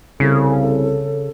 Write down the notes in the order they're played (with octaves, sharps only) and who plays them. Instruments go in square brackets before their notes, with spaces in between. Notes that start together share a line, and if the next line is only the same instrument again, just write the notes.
[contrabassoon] C2 [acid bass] C#3 [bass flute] A4